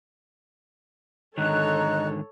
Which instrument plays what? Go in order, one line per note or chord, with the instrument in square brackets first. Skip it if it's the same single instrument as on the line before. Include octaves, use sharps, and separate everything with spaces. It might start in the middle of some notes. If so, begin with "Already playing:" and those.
[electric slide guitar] G#2 D3 D#3 [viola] A4 C#5 [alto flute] D#5 [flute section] A#5 F#6